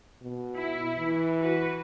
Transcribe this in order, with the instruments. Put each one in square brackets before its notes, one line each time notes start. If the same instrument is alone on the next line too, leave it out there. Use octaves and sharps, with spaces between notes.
[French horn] B2
[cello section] E4
[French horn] E3
[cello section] F#4 B4